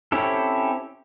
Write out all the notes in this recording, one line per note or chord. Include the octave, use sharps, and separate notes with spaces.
C4 C#4 E4 G4 A4